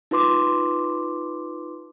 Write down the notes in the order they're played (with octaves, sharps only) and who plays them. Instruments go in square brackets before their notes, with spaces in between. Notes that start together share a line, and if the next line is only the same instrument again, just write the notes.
[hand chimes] D#4 F4 B4 C6 D6